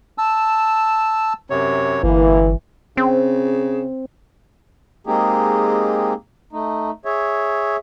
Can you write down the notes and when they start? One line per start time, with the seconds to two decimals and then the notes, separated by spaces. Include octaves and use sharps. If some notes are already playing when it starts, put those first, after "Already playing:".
0.18 A5 E6
1.50 F#2 C3 C#5
2.03 G1 E3 A#3
2.97 C#3 C4
5.07 G#3 A#3 C4 D#4 G4 G#4
6.53 A3 D#4
7.05 G#4 C#5 E5